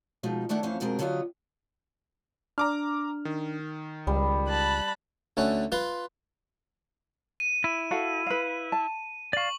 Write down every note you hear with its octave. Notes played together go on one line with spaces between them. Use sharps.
B2 F3 G#3 D#4
D#3 A3 D4 E4 F#5
F2 E3 C#4 C5 F5
F2 B2 G#3 C4 A#4
D3 F#3 C#4 F4 G4 D#5
D4 A#5 D6 F6
D#3
C#2 G3
A5 B5 F#6
D2 A3 C#4 F#5
F4 B4 C6
D#7
E4
F#4 A4 F5
B4 F5
A5
D5 F5 C#6 F#7